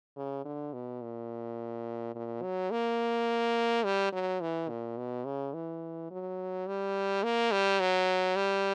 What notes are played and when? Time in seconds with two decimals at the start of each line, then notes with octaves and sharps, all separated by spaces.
0.16 C#3
0.45 D3
0.73 B2
1.02 A#2
2.15 A#2
2.42 F#3
2.71 A#3
3.85 G3
4.12 F#3
4.41 E3
4.69 A#2
4.98 B2
5.25 C#3
5.54 E3
6.11 F#3
6.67 G3
7.23 A#3
7.52 G3
7.80 F#3
8.36 G3